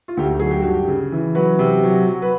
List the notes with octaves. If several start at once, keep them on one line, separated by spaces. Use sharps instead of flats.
F4
D2 G4
F#4
F#3 G#4
G4
G2 F#4
G4
C#3
E3
F#3 B4
C3
F#3
F#3
B4